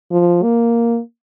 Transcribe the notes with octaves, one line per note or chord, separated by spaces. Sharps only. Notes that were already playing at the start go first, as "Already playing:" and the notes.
F3
A#3